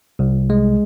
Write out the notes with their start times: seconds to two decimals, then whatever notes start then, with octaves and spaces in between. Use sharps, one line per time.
0.19 C2
0.50 G#3